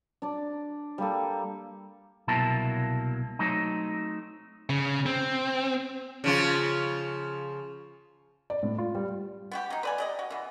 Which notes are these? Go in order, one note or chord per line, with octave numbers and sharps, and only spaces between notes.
D4 D5
G3 A#3 A4
C2 B2 F#3 A#3 E4 A5
F#3 A3 C4 D#4
C#3
C4
C#3 F3 F4
D5
A2
F4
G3
B3 F#4 G4
F#3 D#4
B4 D5 G#5
G4 D5 D#5
F#4
B2 E3